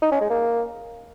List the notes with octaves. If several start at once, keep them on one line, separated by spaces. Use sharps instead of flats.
D#4
C#4
G#3
A#3